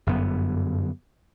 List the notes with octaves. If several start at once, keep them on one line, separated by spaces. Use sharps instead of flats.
G1 F#2 B3